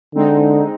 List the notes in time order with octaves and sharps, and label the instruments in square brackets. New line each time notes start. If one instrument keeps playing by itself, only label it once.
[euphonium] D3 [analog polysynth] G#3 C4 D#4